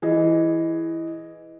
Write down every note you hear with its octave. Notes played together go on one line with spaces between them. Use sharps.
E3 G#4 D#5